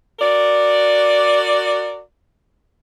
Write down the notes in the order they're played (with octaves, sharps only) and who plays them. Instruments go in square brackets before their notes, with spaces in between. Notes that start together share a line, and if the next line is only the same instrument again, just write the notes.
[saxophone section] F#4 A#4 D5